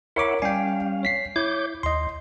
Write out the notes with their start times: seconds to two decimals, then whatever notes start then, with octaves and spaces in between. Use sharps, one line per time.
0.16 E4 A#4 C#5 E5 F#5 D6
0.42 G3 C#4 F5 G5 G#5
1.03 C#5 B6 C7
1.36 E4 C#5 D6 G6
1.83 D#2 D#5 C6